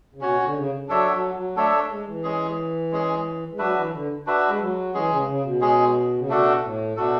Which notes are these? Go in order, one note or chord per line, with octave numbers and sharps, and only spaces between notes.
C#3
B2 C#4 F#4 C#5
D3
C#3
F#3 D4 A4 C#5 E5
F#3
F#3
A3 D4 A4 C#5 E5
G#3
E3
G#3 C#4 G#4
G#3 C#4 G#4
G#3
F#3 D4 F#4 B4 E5
E3
D3
D4 F#4 B4 E5
G#3
F#3
E3 G#3 C#4 G#4
C#3
C#3
B2
G#3 C#4 G#4
C#3
B2 A3 D4 F#4 A4
A2
B2 A3 D4 F#4 A4